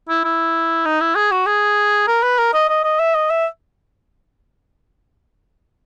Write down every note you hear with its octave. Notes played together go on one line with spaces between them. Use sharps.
E4
E4
D#4
E4
G#4
F#4
G#4
A#4
B4
A#4
D#5
D#5
D#5
E5
D#5
E5